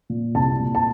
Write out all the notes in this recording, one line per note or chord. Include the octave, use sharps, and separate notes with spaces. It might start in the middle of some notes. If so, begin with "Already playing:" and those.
A#2
C2 A5
A#2
A5